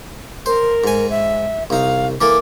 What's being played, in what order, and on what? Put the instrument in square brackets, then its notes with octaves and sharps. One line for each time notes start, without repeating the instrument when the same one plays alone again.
[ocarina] A#4 [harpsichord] C5
[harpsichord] G#2 G#5
[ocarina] E5
[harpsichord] C2 D#4 [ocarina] F5
[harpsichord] E3 A#3 A4 [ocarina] D6